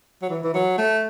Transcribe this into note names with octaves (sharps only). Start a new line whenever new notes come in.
F#3
E3
E3
F#3
A3